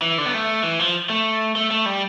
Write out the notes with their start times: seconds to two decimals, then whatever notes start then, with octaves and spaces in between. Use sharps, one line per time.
0.02 E3
0.18 D3
0.26 B3
0.34 A3
0.63 E3
0.79 F3
1.10 A3
1.56 A3
1.71 A3
1.86 G3